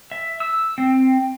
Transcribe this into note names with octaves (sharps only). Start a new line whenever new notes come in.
E5
E6
C4